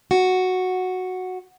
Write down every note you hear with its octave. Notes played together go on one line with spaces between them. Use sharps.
F#4